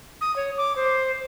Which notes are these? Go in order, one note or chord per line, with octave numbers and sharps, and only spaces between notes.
D#6
C#5
D6
C5